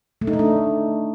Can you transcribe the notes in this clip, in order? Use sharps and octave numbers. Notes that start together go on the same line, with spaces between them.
A3
D#4
A3
D4